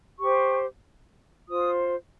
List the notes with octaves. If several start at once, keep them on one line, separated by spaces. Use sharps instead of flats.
G4 C5 C#6
F4 C5 D#6